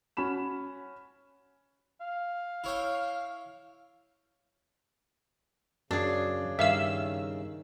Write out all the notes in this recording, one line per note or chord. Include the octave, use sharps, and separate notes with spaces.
C#4 F#4 B5 E7
F5
E4 C#5 G5
F#2 C#3 D4 G#4
G2 D#3 E5 F5 E6